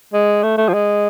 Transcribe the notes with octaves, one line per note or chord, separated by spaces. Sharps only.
G#3
A3
A3
F3
G#3